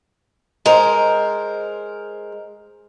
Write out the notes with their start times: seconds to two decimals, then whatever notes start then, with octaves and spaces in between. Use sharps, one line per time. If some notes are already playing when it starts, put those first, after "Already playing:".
0.66 G#3 A#4 C5